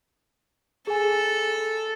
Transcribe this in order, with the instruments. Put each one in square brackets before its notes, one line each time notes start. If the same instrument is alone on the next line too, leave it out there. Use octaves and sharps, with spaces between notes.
[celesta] G#4 G#5 [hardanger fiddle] A4